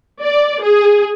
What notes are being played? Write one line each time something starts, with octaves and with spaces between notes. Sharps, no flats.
D5
G#4